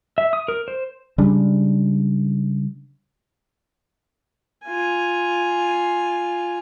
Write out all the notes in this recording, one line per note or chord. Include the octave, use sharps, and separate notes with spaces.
E5
D#6
A#4
C5
C#3 G3 G#3 D4
F4 G#5